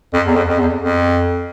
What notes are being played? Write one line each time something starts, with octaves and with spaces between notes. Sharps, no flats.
F2
E2
F2
F2
E2
F2